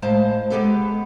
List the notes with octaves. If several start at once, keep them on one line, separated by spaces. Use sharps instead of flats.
A2 G#3 C5 F5 A5
G#3 A#3 B3 G4 A4 B4